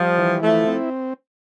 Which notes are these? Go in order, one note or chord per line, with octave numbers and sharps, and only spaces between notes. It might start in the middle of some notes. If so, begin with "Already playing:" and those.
Already playing: F3 G3
E3
F3 A3 E4
C4